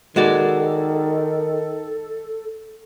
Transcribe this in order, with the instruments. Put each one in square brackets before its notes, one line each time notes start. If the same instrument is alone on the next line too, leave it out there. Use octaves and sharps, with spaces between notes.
[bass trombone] D#3 [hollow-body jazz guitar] G#3 F#4 D5 [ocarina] A4